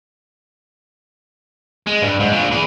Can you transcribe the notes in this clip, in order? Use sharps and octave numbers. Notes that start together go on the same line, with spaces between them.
G#3
G2
G#2
A#2 D4
E3 G#4